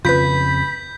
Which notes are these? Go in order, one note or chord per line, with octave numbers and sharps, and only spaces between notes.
F2 C#3 C4 F4 B4 B5 G6 B6